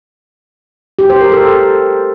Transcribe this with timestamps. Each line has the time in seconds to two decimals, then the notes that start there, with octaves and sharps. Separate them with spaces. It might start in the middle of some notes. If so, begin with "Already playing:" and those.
0.99 G4
1.10 C5
1.21 A#4
1.32 A4